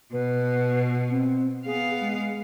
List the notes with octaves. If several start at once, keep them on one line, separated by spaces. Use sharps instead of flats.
B2 B4
C4
B3 G#4 F5
G#3